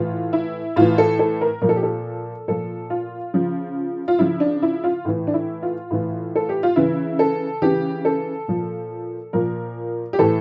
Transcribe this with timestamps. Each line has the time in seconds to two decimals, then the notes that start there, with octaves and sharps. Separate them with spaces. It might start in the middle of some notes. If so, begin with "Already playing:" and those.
Already playing: A2 E3 F4
0.33 E4
0.76 A2 E3 F4
0.98 A4
1.19 A4
1.41 A#4
1.61 A#2 F3 A#4
1.69 A4
1.76 G4
1.83 A4
2.48 A#2 F3 A4
2.90 F4
3.33 C#3 F3
4.08 F4
4.19 C#3 F3 E4
4.40 D4
4.62 E4
4.84 F4
5.05 A2 E3
5.27 D4
5.34 E4
5.63 F4
5.91 A2 E3
6.36 A4
6.49 G4
6.63 F4
6.76 C#3 E3 E4
7.19 A4
7.62 C#3 E3 G4
8.05 A4
8.48 A#2 F3
9.33 A#2 F3 A#4
10.13 G4
10.19 A2 E3 A4